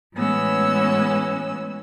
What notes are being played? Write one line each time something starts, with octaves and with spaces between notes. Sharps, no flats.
A2 E3 G#3 B3 C#4 E6